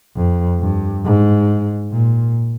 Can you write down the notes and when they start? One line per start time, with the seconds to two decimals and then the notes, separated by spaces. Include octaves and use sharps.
0.17 F2
0.60 G2
1.05 G#2
1.93 A#2